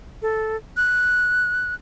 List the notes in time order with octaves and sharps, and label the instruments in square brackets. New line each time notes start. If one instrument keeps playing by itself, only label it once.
[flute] A4
F#6